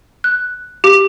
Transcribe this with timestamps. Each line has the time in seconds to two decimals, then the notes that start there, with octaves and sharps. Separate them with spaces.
0.24 F#6
0.84 G4